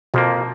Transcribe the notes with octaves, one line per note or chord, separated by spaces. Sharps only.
F2 B2 F3 A#3